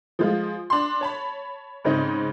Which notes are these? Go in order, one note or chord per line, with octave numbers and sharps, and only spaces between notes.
F3 G#3 F4
D4 C6
C#5 A5 B5
G#2 C#3 C4 D#4